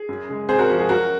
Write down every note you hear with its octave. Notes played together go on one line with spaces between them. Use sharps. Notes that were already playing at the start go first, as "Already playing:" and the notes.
Already playing: G#4
F#2
C#3 G#3
C3 G#4 C5
F#4 A#4
F3 G#3 F#4
G#4
F#2 F#4 A#4